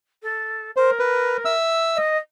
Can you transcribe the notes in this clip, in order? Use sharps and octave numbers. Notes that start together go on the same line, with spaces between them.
A4
A#4 C5
B4
E5 E6
D#5